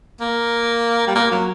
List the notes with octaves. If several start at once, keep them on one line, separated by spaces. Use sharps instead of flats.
A#3
G3
A#3
F#3